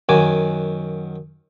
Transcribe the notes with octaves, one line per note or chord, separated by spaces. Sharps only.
F#2 D#3 F#4 G#5 D6